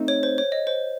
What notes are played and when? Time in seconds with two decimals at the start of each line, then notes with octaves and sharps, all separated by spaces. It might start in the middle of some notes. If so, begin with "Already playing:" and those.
Already playing: A3 C4 D#4
0.08 C#5
0.23 C5
0.38 C#5
0.52 D#5
0.67 C5